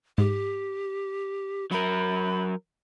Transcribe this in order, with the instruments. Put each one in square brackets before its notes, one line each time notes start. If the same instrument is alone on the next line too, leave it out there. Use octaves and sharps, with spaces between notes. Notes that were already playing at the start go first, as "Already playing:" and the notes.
[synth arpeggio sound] G#2 [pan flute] G4
[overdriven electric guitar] F#3 A#4 [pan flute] B5